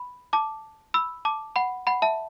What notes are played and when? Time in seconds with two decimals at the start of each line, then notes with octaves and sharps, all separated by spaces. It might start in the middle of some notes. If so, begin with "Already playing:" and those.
Already playing: B5
0.33 A5 D6
0.94 B5 E6
1.25 A5 D6
1.56 F#5 B5
1.87 F#5 B5
2.02 E5 A5